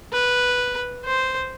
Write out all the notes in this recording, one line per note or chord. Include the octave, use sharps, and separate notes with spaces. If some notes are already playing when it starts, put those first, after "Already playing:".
B4
C5